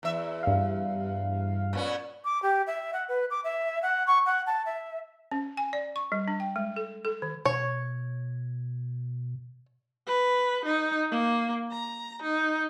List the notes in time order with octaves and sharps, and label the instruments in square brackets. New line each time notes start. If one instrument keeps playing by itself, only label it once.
[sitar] E2 E5
[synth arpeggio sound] G2 F5
[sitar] A#2 B3 C#4
[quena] D6
G4
E5
F#5
B4
D6
E5
F#5
C#6
F#5
A5
E5
[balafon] C#4
G#5
D5
C#6
G3
D4
G5
G#3
A4
A4
D#3
[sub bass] B2 [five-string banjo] C#5
[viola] B4
D#4
A#3
A#5
D#4